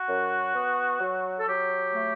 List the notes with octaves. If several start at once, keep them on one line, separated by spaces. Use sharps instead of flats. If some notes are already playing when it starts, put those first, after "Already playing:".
Already playing: F#4
F#2
B3
F#3
A4
F#3 G4
A3